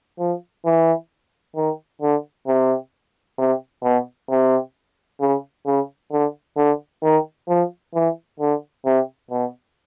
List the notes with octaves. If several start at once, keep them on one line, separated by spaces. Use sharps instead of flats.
F3
E3
D#3
D3
C3
C3
B2
C3
C#3
C#3
D3
D3
D#3
F3
E3
D3
C3
B2